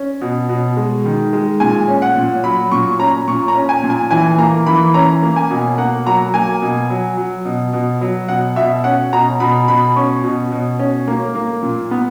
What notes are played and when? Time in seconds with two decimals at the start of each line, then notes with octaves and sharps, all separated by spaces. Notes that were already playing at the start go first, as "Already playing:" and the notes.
Already playing: C#4
0.21 B2
0.49 B2
0.77 G#3
1.05 D#3
1.33 G#3
1.60 A#2 G#5
1.88 C#4
2.02 F#5
2.16 A#2
2.44 F#3 B5
2.71 A#2 C#6
2.99 C#4 A#5
3.28 A#2 C#6
3.48 A#5
3.55 C#4
3.69 G#5
3.83 A#2
3.90 G#5
4.11 E3 G#5
4.38 A#3 A#5
4.66 E3 B5
4.94 C#4 A#5
5.22 A#3
5.36 G#5
5.50 B2
5.78 A#3 F#5
6.06 F#3 A#5
6.34 A#3 G#5
6.62 B2
6.90 F#3
7.17 F#3
7.45 B2
7.73 B2
8.01 F#3
8.28 B2 F#5
8.56 B2 E5
8.84 C#4 F#5
9.12 B2 A#5
9.40 B2 B5
9.68 B2 B5
9.96 C#4 C#6
10.24 B2
10.52 B2
10.79 C#4
11.08 A#3
11.35 A#3
11.63 A#2
11.91 B3